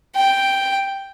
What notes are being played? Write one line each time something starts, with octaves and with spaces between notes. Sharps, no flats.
G5